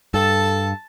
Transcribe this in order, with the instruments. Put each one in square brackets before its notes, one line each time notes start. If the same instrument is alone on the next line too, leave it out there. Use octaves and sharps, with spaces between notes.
[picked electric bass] G2 [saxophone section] A4 [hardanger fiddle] A5